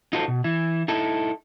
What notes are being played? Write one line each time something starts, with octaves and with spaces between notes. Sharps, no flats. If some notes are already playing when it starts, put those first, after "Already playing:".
D#4 F4 F#4 A4 B4 C5
B2
E3 E4
D#4 E4 A4